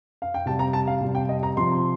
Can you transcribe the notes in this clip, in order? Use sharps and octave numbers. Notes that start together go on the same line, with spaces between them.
F5
G5
C3 G3 A5
A#5
A5
F5
C3 G3
G5
D#5
A#5
C3 F3 C6